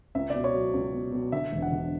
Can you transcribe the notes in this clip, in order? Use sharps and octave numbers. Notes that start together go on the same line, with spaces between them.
C#2 E5
B2 D5
C#5
F#3
C#2
B2
B2
D3 E5
E1
F#5
D3